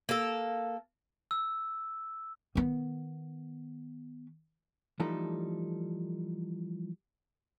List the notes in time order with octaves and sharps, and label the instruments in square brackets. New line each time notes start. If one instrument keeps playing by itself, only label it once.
[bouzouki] A#3 A4
[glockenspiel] E6
[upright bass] D#3 B3
[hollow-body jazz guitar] E3 F3 G3 A3 D#4 A4